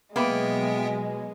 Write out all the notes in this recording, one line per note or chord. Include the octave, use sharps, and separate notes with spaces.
B2 F#3 G#3 A#3 B3 B4 E5 G5